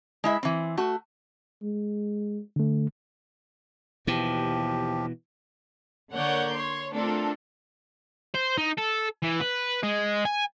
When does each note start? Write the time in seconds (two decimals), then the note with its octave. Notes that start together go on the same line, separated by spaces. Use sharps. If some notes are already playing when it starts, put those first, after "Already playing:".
0.24 G#3 E4 E5
0.43 E3 C4
0.77 A3 F#4
1.62 G#3
2.56 D3 A3
4.07 D#2 B2 E3 F3 G4
6.13 D3 A#3 C#5 D5 F#5 G6
6.55 C#5 C6
6.92 A3 C4 D4 F4 A4 A#4
8.34 C5
8.58 D#4
8.78 A4
9.24 E3
9.42 B4
9.83 G#3
10.25 G#5